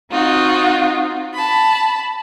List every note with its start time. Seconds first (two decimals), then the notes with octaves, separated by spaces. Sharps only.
0.11 C4 D#4 F4 F#4
1.33 A5 B5